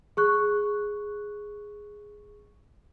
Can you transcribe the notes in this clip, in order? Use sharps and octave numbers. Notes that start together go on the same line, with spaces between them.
G#4 C#6 F#6